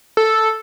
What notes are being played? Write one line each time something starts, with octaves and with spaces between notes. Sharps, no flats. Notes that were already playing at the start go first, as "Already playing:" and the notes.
A4